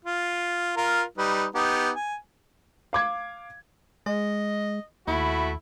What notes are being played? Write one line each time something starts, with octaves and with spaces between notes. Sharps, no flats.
F4
F4 A#4
G3 D#4 B4
B3 D#4 G4
G#5
F5 D6 G#6
G#3 D#5
D#2 A3 E4 F#4 B5